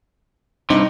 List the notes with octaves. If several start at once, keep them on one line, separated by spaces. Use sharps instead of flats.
G2 C3 D#4